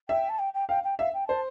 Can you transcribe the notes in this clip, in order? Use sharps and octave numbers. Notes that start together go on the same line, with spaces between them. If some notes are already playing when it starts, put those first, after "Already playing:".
E5 G5
A5
G5
G5
F5 G5
G5
E5 F5
G5
C5 A5